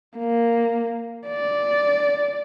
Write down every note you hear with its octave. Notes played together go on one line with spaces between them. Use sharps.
A#3
D5